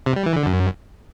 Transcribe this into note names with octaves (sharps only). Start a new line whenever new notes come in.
C3
G3
E3
D3
F#2